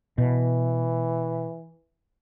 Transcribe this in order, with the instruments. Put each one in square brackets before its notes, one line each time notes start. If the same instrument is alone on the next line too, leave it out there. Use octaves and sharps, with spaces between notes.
[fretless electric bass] B2 [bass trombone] E3